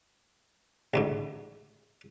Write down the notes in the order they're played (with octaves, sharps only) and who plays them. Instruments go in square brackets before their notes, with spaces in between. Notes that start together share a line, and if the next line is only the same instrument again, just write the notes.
[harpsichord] A1 D2 G#2